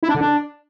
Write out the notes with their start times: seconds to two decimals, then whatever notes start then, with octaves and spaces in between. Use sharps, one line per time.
0.03 E4
0.09 D4
0.15 D3
0.21 D4